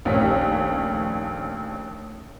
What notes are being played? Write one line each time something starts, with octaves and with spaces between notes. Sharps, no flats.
A#1 D#2 A3 C#4 B6